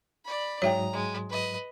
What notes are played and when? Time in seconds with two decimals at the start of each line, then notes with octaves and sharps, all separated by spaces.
0.25 D5 B5
0.62 G#2 F#3 C#5 E5 G5 A#5 D#6
0.93 G#3
1.30 B4 D#5